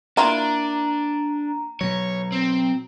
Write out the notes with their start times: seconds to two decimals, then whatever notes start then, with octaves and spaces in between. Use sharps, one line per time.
0.17 A#3 D4 E4 F4 A#5
1.81 B2 F#3 C#5
2.32 C4